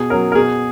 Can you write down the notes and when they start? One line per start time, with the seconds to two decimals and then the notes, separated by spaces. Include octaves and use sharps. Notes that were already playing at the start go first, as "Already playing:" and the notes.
Already playing: B2 G#4
0.10 F#3 C#4 A#4
0.32 A#4
0.35 B2 G#4